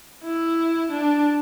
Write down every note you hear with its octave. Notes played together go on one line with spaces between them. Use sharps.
E4
D4